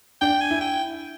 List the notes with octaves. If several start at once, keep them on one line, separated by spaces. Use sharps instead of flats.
D4 G5
G#5
E4
G5